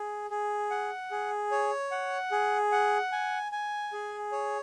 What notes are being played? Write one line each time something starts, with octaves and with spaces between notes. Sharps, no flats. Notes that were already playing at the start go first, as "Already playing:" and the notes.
Already playing: G#4
G#4
F#5
G#4
C#5
F#5
G#4
F#5
G#5
G#5
G#4
C#5